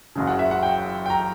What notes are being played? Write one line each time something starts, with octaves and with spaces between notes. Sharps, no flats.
F#1 F#2 C#3
F#5
E5
F#5
G5
G5
A#5